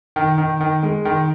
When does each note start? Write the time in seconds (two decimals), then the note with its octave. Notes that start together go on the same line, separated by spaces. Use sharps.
0.16 D#3
0.38 D#3
0.61 D#3
0.83 G#3
1.05 D#3